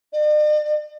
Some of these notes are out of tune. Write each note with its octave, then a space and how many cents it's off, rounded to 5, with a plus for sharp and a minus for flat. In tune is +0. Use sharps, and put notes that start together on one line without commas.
D5 +45